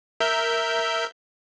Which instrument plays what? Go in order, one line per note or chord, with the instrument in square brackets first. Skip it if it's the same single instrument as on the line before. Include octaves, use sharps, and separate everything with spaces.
[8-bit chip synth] A#4 E5 G6